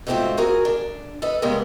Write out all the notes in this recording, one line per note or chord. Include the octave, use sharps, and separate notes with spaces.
G#2 A3 B3 C4 F4 F#4
F#4 G#4 A#4
D4
A4 B4 D#5
C#3 G3 G#3 A#3 B3